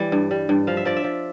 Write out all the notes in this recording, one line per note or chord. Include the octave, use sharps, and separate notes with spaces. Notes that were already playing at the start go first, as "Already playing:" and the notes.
Already playing: E3 G3
G2
G3
G2
F3 F5
E5
F3 D5
E5
F3